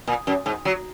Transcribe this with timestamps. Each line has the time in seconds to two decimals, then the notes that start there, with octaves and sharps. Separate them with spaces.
0.08 A#2
0.27 F#2
0.46 G#2
0.65 F#3